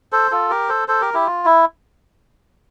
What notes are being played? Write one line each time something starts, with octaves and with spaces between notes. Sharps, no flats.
A4 C5
F4 A4
G4 A#4
A4 C5
A4 C5
G4 A#4
E4 G4
F4
E4